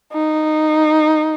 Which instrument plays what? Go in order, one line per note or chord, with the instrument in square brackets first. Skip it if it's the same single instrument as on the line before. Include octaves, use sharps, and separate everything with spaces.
[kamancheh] D#4